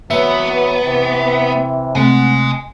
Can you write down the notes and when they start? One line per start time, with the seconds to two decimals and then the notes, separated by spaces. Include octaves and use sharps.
0.10 E3 F#3 B3 E5
0.84 C3 E3
1.95 C3 A3 C4 D#5 F#5 G#5